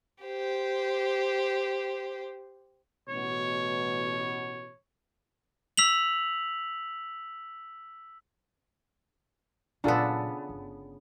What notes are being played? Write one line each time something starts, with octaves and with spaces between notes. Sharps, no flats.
G4 C5
A1 B2 C#5
E6 B6 F7 F#7
A#2 C#3 F#3 B3 D4 F4 A4
G1